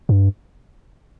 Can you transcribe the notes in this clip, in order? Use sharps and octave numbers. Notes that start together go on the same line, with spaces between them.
G2